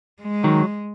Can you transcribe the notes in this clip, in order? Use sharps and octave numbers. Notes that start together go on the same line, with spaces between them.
G#3
D#3 F#3